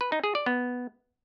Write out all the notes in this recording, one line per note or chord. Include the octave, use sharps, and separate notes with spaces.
B4
D#4
G#4
D5
B3